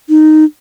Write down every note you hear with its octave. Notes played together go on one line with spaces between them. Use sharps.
D#4